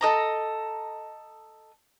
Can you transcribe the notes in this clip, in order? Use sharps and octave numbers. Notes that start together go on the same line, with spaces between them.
A4 D#5 A#5